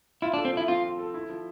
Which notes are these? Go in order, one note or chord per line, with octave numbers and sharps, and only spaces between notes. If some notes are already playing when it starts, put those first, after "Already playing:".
E4 F4
D4
A4
C4
F3 E4
C4 F4
F4
A4
E4
F3